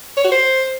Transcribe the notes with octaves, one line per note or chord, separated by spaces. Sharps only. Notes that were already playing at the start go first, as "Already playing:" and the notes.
C#5
F#4
C5